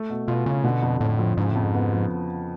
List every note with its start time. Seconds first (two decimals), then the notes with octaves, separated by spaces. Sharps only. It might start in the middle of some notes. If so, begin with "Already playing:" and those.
Already playing: A3
0.09 B2
0.28 B2 F4
0.46 C#3 C#4
0.64 B2 D3
0.82 F2
1.01 F2 A2
1.19 F3
1.37 G#2 C#3
1.51 F2 A2
1.63 G#2
1.74 B3
1.92 F3